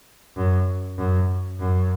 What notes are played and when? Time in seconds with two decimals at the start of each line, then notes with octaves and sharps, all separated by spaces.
0.36 F#2
0.98 F#2
1.59 F#2